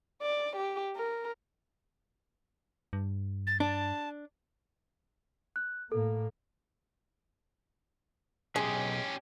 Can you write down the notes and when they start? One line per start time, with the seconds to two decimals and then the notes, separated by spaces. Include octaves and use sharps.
0.22 D5
0.56 G4
0.97 A#4
2.93 G2
3.47 A6
3.60 D4 A5
5.56 F#6
5.92 A2 A#3 A4
8.56 B1 G#3 C#4 G4 G#4